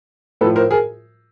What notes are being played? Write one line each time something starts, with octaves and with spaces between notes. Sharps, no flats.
A2 F3 A4 B4
A#4 C5
G#4 A#4